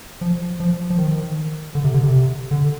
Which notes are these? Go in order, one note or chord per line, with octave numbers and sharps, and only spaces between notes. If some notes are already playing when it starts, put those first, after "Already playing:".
F3
F3
F3
D#3
D3
C3
D3
C3
D3